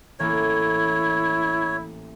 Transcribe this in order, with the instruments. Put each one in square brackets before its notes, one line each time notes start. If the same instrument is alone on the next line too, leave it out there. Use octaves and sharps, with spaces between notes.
[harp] A1 A#3 [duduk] E4 [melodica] C#5